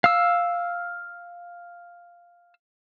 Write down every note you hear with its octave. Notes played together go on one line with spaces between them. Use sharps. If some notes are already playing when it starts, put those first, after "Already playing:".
F5 E6